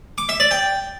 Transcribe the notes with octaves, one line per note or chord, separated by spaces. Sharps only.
D6
E5
D5
G5